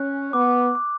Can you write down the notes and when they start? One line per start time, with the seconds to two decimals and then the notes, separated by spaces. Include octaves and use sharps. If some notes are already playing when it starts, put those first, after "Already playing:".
Already playing: C#4 F#6
0.33 B3 D6
0.75 D6